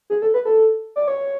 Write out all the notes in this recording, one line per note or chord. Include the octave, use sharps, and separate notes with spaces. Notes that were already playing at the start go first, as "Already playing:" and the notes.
G#4
A4
B4
A4
D5
C#5